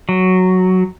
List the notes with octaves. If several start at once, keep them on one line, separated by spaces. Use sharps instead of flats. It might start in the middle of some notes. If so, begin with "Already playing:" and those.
F#3